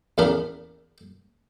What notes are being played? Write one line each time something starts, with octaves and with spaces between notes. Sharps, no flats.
E2 A2 C#4 D4 A#4 B5